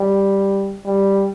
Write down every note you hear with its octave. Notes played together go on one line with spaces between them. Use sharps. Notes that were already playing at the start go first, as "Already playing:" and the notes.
Already playing: G3
G3